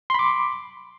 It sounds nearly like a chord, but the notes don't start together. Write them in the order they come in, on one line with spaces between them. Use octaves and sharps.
C6 B5 D6